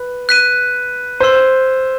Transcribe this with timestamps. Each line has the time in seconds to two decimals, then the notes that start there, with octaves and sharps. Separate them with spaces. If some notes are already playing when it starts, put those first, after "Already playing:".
Already playing: B4
0.29 F#6 B6 D#7
1.20 C5 C6 E6 G#6 B6 D#7